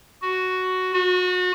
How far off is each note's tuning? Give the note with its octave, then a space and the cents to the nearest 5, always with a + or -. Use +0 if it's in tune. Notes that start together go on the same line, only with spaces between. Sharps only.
F#4 +5
F#4 -30